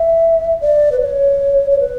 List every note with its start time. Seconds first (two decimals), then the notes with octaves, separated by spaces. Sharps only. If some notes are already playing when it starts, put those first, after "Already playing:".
Already playing: E5
0.61 D5
0.92 B4
1.00 C#5
1.70 C#5
1.79 B4